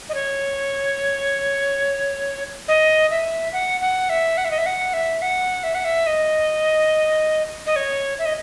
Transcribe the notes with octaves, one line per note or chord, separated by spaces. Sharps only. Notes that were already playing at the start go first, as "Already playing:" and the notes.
D#5
C#5
D#5
E5
F#5
F#5
E5
F#5
E5
D#5
E5
F#5
E5
F#5
E5
F#5
E5
D#5
D#5
C#5
E5
D#5